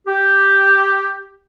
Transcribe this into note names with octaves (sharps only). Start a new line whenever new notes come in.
G4